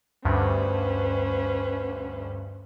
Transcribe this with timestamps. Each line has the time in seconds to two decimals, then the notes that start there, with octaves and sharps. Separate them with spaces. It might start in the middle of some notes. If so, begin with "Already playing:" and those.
0.25 D2 G2 C#4 B4 C5